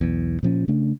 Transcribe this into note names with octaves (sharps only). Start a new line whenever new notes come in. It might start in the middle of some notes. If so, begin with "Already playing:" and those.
B1 E2
A#2 F3 C#4
C#3 A3 D4